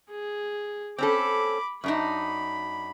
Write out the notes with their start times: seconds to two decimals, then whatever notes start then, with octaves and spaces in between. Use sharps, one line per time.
0.10 G#4
0.98 C4 C#4 A4 B5 D6
1.84 F#2 D4 D#4 B5